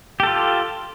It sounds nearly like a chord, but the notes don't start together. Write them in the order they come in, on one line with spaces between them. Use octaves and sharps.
G4 A4 F4